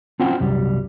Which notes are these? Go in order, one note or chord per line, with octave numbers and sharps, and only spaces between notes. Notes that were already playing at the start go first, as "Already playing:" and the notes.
C4 C#4 F4 C5 F#5 G5
C2 F#2 G3